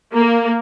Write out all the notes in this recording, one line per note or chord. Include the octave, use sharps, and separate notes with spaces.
A#3